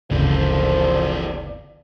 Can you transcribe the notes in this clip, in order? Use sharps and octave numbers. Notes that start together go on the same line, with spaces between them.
G1 D2 C#3 E3 F3 C4 D5